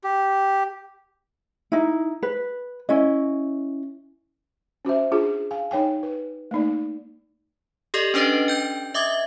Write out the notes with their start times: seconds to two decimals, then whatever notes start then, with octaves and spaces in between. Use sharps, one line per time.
0.04 G4
1.72 D#4 E4
2.23 B4
2.89 C#4 E4 D#5
4.85 C#4 F#4 C5 E5
5.11 D4 F4 G#4
5.51 F5 G#5
5.71 D#4 C#5 G5 G#5
6.03 B4
6.51 A3 A#3 D#4 D5
7.94 G4 A4 D5 D#5
8.14 C#4 D4 A4 B4 D#5 A6
8.48 G5 G6
8.94 D#5 E5 D6 D#6 G#6